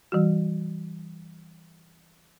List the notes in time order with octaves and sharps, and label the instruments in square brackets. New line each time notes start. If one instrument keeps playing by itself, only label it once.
[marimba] E3 G3 F#4